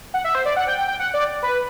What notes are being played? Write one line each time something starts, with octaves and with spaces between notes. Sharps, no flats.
F#5
E5
C5
D5
F#5
G5
G5
G5
F#5
D5
B4